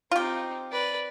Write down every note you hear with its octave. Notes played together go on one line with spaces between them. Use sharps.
C4 D#4 F4 G4
B4 D5